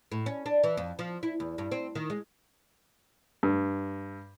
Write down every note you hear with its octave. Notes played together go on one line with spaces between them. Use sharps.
A2
C#4
D4
E3
F2
F3
E4
E2
G2
C4
D#3
G#3
G2